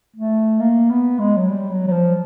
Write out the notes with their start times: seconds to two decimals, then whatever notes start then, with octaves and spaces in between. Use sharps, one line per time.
0.16 A3
0.60 A#3
0.90 B3
1.19 G#3
1.37 F#3
1.48 G3
1.70 F#3
1.87 F#3
1.92 F3